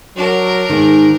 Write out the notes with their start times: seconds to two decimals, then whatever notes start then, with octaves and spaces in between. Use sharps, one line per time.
0.16 F#3 D4 A#4
0.69 G#2 D#3